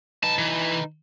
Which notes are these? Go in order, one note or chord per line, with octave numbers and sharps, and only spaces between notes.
D#4 B4 A5
E3